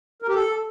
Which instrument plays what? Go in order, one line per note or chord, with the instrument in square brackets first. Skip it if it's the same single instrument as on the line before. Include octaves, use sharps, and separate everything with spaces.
[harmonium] A#4
G4
A4